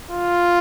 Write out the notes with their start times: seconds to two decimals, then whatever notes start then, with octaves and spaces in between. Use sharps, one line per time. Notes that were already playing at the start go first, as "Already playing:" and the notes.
0.11 F4